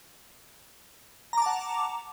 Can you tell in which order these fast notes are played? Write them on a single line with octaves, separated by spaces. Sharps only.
A#5 D6 A5 F#5